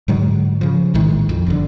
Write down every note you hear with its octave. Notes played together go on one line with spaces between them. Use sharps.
G#2 D3 F#3 G#3
C#3 F3
A#1 A2 D#3 G#3
F2
G1 A#2 D3